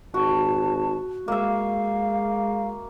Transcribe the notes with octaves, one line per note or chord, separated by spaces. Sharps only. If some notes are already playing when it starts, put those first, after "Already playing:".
G#1 F#4 A5
G#3 A#3 E5 F5